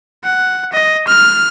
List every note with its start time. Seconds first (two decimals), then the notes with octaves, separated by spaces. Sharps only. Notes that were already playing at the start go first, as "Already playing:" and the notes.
0.24 F#5
0.73 D#5
1.08 F6